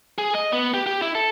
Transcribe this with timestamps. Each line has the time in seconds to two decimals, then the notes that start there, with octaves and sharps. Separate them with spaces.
0.18 G#4
0.35 D#5
0.53 B3
0.74 G4
0.86 G4
1.02 E4
1.15 A4